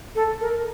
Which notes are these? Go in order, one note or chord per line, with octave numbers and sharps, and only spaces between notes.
A4
A#4